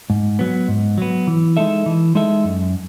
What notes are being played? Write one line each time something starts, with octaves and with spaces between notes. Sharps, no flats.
G#2
F#3 B3
G#2
F#3 B3
E3
G#3 D#4 A4 E5
E3
G#3 D#4 A4 E5
F#2